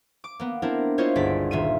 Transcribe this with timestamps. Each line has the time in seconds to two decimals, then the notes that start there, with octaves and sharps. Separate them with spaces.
0.24 D6
0.40 A#3 B3
0.62 C4 D4 E4 A#4
0.98 E4 F4 C5 C#5 D#5
1.16 G1 C#2 D5 B6
1.51 D#1 F4 E5 D#7